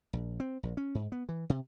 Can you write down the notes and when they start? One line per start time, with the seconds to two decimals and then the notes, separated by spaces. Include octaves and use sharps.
0.13 A#1
0.40 C4
0.63 A#1
0.77 C#4
0.95 G#2
1.12 B3
1.29 E3
1.50 C3